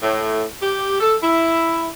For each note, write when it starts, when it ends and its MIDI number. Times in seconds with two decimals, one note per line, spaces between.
0.03 0.44 45
0.62 0.97 67
1.00 1.16 69
1.23 1.87 64